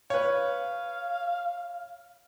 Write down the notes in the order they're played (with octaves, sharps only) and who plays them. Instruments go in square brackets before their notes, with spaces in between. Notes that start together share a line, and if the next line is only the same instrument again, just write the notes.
[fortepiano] B4 C#5 [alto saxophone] F5